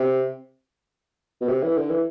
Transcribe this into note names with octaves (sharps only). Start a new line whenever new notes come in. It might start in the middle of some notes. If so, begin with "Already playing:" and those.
Already playing: C3
B2
C3
E3
D3
E3